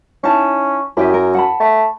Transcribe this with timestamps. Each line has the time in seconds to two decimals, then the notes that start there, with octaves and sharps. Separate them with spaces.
0.24 C#4 D#4 E4 A5
0.97 F#2 E4 G4 D#5
1.14 A#4
1.35 F#5 A5 B5
1.60 A3